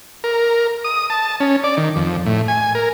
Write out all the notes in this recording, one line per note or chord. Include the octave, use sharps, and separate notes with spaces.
A#4
D#6
A5
C#4
D5
D#3
F2
A2
G#5
A#4